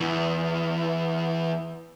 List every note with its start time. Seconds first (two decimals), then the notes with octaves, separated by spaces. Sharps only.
0.01 E2 E3